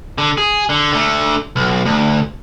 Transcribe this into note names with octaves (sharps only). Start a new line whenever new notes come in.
D3
G#4
D3
D3 A3
B1
D2